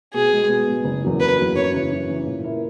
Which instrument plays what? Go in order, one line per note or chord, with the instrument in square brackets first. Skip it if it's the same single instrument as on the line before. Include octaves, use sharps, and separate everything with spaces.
[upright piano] B2 [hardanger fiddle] G#4
[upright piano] G#3 B3
B2
G#3 B3
F#1
E2 C#3 F#3 A#3
[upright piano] F#1 [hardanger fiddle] B4
[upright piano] E2 C#3 F#3 A#3
[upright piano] F#2 [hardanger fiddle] C#5
[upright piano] C#3 E3
F#2
C#3 E3
A#2
A#3 E4